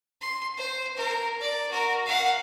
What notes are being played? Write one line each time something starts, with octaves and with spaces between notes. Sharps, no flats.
C6
C5
A#4
D5
F#4 A#4
F5 F#5